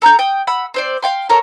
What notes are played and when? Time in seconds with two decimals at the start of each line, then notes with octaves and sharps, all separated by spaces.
0.02 A4 A#5 F#6 G6
0.19 G5 D#6
0.47 F#5 B5 E6
0.74 C4 C5 D5
1.03 F5 G5 C6
1.29 A4 A#4 C#5 A#5